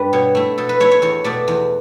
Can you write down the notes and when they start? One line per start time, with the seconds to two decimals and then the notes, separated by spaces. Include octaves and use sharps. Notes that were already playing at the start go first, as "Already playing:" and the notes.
Already playing: G2 G3 A4 B4
0.13 B2 C#5
0.35 A3 E4
0.58 B2 A4
0.69 B4
0.80 A3 E4 C#5
0.91 C#5
1.02 E2 C#5
1.24 B2 A3 D5
1.48 E2